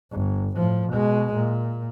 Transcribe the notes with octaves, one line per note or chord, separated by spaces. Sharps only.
G1
A2 F3
B2 G#3
A#2